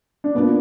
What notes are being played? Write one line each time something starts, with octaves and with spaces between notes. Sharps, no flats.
D4
B2 A#3 B3 D4 F4